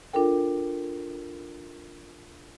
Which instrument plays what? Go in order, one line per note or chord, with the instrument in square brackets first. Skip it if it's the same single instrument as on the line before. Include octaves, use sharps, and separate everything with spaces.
[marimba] D4 F4 A4 A#4 G5